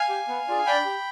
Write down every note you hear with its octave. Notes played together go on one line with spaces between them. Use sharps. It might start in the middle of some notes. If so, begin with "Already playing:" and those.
Already playing: F5 G#5
G4
B3
D4 F4 G#4
D4 G5 B5
G4